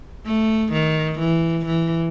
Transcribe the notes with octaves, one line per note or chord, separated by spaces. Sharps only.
A3
D#3
E3
E3